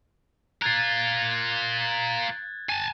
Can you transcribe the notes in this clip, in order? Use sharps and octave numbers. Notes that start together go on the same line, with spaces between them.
F4 A#4 F#6 G#6 A6
G#5 A5